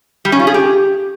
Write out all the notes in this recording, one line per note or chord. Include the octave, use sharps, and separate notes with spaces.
G3
C#4
F4
G#4
G4